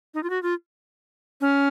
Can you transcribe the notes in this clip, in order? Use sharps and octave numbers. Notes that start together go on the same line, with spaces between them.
D#4
F4
F#4
F4
C#4